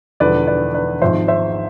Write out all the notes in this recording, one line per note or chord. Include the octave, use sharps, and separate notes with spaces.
E1 E2 D3 F3 B4 D5
B4 D5
B4 D5
G#1 G#2 F3 C5 E5
C5 E5